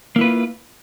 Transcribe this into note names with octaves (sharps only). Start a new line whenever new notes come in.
A#3 E4 F4 B4